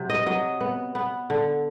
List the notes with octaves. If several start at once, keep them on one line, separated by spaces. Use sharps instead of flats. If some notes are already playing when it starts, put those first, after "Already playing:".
Already playing: C3 F#3
D#5
F#3 D#5
B3
B3
D3